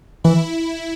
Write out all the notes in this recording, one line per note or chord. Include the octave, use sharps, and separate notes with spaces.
E3 E4